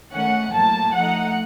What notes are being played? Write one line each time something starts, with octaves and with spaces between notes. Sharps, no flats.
D#3 A3 C#4 F#5
A2 F#3 A#3 A5
F3 A3 D#4 F#5